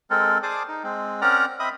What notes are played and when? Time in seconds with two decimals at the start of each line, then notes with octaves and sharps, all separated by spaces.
0.10 G#3 C4 A4 A#4
0.43 G#4 C5 D5 A5 D6 D#6
0.69 D#4
0.84 G#3 C4
1.22 C4 C#4 A#4 D5 F#5 A#5
1.60 C4 D#5 E5 B5 D#6